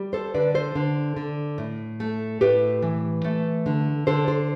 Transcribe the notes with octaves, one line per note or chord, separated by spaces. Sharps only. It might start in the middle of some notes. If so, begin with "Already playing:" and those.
Already playing: G3
A4 C5
D3 B4 D5
A4 C5
D3
D3
A2
A3
A2 G4 B4
E3
A3
D3
D3 A4 C5
A4 C5